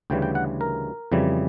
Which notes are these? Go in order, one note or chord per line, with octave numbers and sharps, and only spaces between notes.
D2 C#3 E3 G3 G5
G5
F#5
A#4
F2 C#3 E3 G3